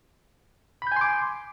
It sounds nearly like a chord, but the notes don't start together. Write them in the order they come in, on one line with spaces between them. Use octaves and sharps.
B5 G6 G#5 C6 D6